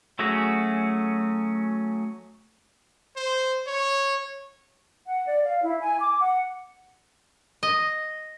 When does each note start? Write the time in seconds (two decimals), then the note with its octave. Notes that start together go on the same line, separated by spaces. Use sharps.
0.19 F#3 A3 C#4 F#4 G#4
3.16 C5
3.67 C#5
5.07 F#5
5.27 D5
5.45 F5
5.62 E4
5.81 G#5
6.00 D6
6.20 F#5
7.63 D#5